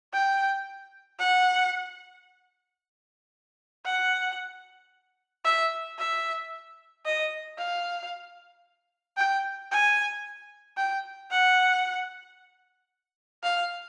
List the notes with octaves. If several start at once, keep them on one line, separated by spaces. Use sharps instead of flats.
G5
F#5
F#5
E5
E5
D#5
F5
G5
G#5
G5
F#5
F5